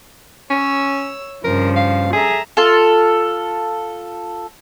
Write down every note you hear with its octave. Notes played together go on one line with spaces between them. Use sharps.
C#4 C#5 E6
G2 C#3 F3 A#4
F5
G#4 A4 E5 A#5
F4 A4